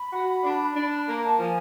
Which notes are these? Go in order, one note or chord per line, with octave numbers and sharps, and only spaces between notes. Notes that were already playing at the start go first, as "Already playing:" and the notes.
Already playing: B5
F#4
D4
D4
A#3 A#5
A5
F3 G#5